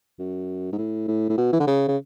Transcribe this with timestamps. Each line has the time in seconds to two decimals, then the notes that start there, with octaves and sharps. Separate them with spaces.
0.19 F#2
0.73 G#2
0.78 A2
1.08 A2
1.30 A2
1.38 B2
1.53 E3
1.60 D3
1.67 C#3
1.88 C#3